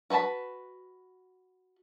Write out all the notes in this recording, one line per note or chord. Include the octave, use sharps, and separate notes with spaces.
F#4 B4 C5 A5 B5